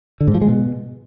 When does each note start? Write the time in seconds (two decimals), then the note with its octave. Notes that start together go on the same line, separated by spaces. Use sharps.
0.21 D3
0.28 G#2
0.35 F3
0.41 G#3
0.48 B2